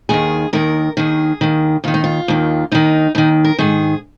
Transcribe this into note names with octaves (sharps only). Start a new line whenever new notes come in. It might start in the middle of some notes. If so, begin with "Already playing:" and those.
D#2 D#3 G#4
D#2 D#3 A#4
D#2 D#3 G#4
D#2 D#3
D#2 D#3 F4
D#4
F4
D#2 D#3
D#2 D#3 D#4
D#2 D#3 D#4
A#4
G#2 D#3 G#4